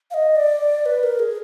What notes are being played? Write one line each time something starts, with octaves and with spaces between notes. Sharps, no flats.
F5
D#5
D5
B4
A#4
G#4